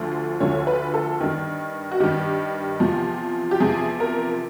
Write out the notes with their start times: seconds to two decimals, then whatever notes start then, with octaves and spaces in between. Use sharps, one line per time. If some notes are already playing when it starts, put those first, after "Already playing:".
Already playing: D2 D3 F3
0.40 D2 D3 F3 C#5
0.67 B4
0.94 A4
1.20 G2 D#3
1.91 F#4
2.00 G2 D#3 G4
2.80 E2 C3 F3
3.51 G4
3.60 E2 C3 F3 G#4
4.00 A#4